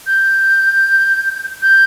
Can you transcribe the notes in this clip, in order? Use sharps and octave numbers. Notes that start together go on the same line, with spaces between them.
G6
G6